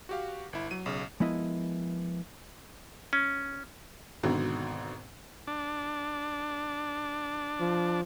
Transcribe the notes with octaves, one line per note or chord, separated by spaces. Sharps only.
F#4 G4 F5
G1 E4
F#3 D#7
B1 C#3
F3 G#3 B3 E4 A#4 D#5
C#4
G#1 G#2 B2 D3
D4
F3